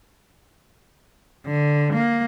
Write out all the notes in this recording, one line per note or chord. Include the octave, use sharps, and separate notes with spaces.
D3
A#3